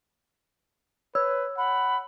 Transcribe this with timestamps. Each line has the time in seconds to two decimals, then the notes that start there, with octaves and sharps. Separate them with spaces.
1.15 B4 C#5 E6
1.58 F#5 B5